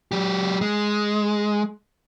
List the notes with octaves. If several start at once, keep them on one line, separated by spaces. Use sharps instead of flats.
F#3 G4
G#3